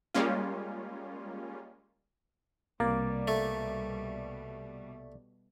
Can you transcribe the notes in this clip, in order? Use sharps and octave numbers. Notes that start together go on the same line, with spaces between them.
G3 G#3 A#3 C#4 F4
C2 B2 G3 A#3 D5
A3